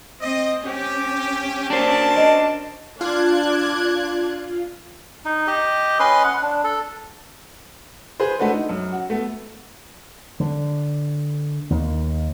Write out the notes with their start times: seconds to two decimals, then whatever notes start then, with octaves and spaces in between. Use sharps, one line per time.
0.21 C4 D#5
0.65 C4 C#4 G4
1.70 D4 F#4 A#4 C5 A5
2.16 D#5
3.01 D4 F4 F#6 G#6
5.25 D#4
5.47 G4 D#5
6.00 C#4 B4 D#5 C6
6.24 F#5
6.43 D4
6.64 A4
8.20 G#4 B4 C5
8.39 A3 D4 F#4 B4 C5
8.53 D#4
8.69 F#2
8.92 F#4
9.10 A3 B3
10.40 D3
11.70 D#2